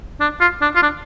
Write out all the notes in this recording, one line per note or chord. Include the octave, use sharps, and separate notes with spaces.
D4
F4
D4
F4
D4